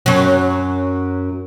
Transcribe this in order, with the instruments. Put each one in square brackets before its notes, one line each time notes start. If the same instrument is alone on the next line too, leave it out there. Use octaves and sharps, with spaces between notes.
[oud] F#2 F#3